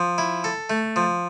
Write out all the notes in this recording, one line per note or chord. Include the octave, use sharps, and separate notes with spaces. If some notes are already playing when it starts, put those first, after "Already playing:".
Already playing: F3
E4
A4
A3
F3